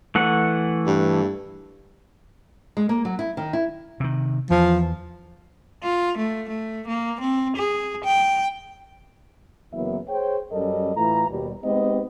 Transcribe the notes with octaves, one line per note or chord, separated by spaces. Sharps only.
E3 A3 F#5
G2
G#3
A#3
F#3
E4
D#3
E4
C3 D#3
E2 F3
F4
A3
A3
A#3
C4
G#4
G5
F#1 F#2 E3 A#3 B3 E5
G#4 C5 C#5 G5
F#2 G3 C#4 A4 A#4 D#5
A2 E3 F4 A#5
D#2 B2 G3
G#3 B3 C4 D#4 G4 D#5